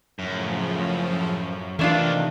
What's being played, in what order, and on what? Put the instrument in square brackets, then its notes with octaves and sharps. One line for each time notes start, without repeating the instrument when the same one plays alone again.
[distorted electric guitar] F#2 [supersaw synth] A2 C#3 F3
[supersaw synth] C3 D#3 [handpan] E3 [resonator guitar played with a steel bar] A3 D4 F4 [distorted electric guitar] A#3 G4